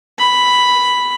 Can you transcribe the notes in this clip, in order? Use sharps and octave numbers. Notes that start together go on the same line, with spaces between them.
B5